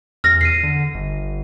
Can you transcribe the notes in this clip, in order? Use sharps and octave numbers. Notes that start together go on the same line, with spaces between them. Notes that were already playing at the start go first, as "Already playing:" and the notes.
E2 F6 A#6
C7 D#7
D3
G1